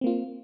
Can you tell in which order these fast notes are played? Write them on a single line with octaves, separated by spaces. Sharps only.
C4 A#3 F4